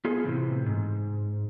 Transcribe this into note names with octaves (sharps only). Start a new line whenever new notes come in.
B3 F4 G#4 A4
A2 C3 E3
G#2